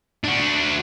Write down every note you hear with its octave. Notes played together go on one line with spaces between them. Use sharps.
D4 F#4